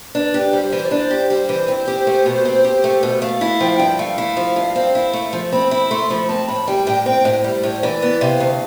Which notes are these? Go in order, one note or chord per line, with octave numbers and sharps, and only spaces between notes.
D4 B4
G4
G3 C5
E3
D5
D4 C5
G4
G3 C5
E3
C4
G4
A3
B2
C4
G4
A3
B2
A3 F5
E4
F3 G5
F5
G2 G5
A3 F5
E4
F3
G2
C4
E4
A3
F3
C4 B5
E4 B5
A3 C6
F3 B5
C4 A5
A2 B5
G3 G5
A2 G5
C4 G5
A2 C5
G3 C5
A2 C5
E3 D5
B3
C3 F5
D2